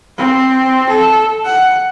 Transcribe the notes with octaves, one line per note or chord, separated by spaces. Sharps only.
C4
A4
F#5